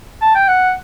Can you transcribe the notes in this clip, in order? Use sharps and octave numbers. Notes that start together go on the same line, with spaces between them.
A5
G5
F#5